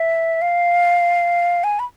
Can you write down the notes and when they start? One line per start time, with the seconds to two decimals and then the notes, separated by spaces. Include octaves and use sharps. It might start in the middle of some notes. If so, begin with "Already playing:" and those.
Already playing: E5
0.42 F5
1.64 G#5
1.79 B5